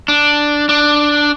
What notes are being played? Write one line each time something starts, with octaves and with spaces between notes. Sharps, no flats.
D4
D4